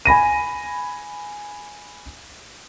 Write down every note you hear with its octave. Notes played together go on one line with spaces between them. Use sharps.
G#5 B5 A#6 D#7